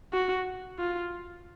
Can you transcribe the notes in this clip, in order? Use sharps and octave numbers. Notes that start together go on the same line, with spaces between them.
F#4
F4